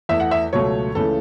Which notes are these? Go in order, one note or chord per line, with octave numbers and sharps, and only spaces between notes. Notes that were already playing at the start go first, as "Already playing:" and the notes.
E2 E3 A3 E5
F#5
E5
C#2 B2 F#3 A3 C#5
C#2 C#3 E3 A3 A4